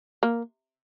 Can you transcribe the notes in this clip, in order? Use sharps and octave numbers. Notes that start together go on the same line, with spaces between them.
A#3